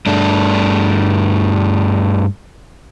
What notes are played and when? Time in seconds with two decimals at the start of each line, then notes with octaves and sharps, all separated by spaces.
0.06 G2 A3 D4